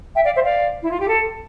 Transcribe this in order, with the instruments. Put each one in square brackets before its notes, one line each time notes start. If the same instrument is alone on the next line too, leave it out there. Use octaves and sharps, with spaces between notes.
[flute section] E5 G5
D5 F5
C5 E5
D5 F5
E4
F4
G4
A4